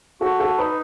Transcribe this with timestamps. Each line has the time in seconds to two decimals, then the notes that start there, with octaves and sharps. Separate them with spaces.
0.21 F#4 A4
0.40 A4
0.58 D#4 B4